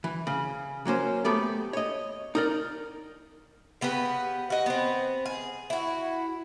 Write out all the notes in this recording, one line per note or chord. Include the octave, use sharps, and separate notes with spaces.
E3
C#3
F#3 A#3 C#4 C5
A3 B3 G4 A4
C#5 D#5
D#4 A#4 D5
C#3 B3 G4 B4
F#4 D#5
B3 C4
G#4
E4 F#4